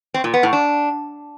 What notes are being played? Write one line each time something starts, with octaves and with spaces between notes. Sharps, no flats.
C4
A#2
B3
A2
D4